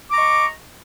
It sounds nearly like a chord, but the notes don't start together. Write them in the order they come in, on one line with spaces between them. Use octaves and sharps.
D6 A#5 C#6 D#5